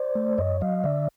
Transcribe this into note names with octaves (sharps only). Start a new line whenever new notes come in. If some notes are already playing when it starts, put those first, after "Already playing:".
Already playing: C5 D5
A3
F#2 C#5 D#5
F#3 D#5 F5
D3 D5 E5